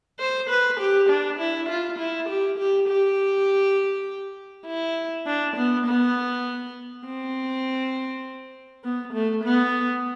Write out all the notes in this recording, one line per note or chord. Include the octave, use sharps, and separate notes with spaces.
C5
B4
G4
D4
E4
F4
E4
G4
G4
G4
E4
D4
B3
B3
C4
B3
A3
B3